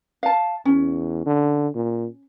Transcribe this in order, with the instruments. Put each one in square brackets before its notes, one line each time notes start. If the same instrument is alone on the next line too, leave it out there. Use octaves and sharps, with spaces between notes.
[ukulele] F5 A5
[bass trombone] E2 [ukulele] C#4
[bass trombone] D3
A#2